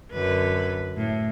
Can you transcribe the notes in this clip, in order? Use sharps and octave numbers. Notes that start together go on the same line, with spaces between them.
F#2 D3 B4
A2